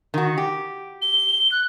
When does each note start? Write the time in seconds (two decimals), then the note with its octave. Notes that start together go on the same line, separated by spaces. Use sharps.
0.14 D#3 F#4
0.38 G4
1.02 G7
1.52 F#6